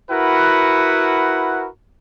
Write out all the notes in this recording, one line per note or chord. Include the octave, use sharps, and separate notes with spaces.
E4 F#4 A#4 B4 F#5